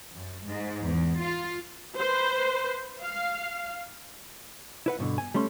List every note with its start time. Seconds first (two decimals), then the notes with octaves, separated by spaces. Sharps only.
0.13 F#2
0.47 G#2
0.83 E2
1.20 F4
1.97 B4 C5
3.01 F5
4.86 E4 B4 F#5
4.99 G2 B2 D3
5.18 G#5
5.34 G3 A3 C#4 C6